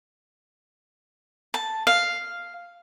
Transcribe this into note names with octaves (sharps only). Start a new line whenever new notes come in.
A5
F5